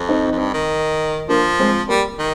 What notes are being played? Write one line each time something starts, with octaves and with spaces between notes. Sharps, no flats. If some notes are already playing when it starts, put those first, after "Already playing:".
Already playing: F2
C4 D#4
F2
G2
D#3
F3 A#3 D4
G#3 C4
G3 A#3
D#3